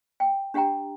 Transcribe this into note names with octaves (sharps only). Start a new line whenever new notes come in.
G5
D4 G4 F#5 G5 A#5